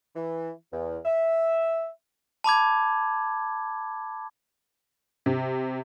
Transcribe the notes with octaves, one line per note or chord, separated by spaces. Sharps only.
E3
E2
E5
A5 B5 D6 G#6
C3